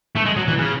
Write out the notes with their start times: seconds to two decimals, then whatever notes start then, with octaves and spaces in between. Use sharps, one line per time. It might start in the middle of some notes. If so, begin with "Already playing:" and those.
0.15 A3
0.25 G#3
0.36 F#3
0.48 E3
0.59 C#3